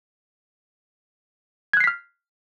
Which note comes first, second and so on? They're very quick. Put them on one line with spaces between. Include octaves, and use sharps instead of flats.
G#6 F#6 C7 B6 F6